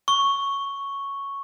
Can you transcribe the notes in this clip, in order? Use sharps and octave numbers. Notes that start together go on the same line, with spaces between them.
C#6